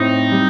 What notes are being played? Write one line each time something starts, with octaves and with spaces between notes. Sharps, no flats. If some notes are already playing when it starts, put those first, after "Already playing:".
Already playing: A2 C4 D#4
G3